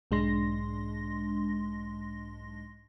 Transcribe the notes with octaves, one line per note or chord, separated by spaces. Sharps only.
B1 G#2 G#3 D4 C6 A#6